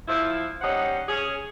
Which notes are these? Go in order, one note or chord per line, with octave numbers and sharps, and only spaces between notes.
F3 E4
G3 C#4 D#4 C5 F#5
C#4 G#4